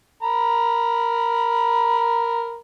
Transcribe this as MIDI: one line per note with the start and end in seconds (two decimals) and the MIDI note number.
0.23 2.56 70
0.23 2.56 82
0.23 2.56 83